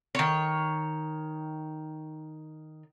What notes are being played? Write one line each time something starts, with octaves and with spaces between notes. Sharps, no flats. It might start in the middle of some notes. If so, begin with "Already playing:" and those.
D#3 C#5